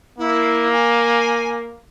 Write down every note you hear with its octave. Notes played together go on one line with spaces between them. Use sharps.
A#3 E4
G#5